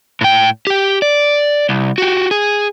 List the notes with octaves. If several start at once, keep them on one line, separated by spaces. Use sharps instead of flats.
A2 G5
G4 G5
D5
C2
F#4 G4
G#4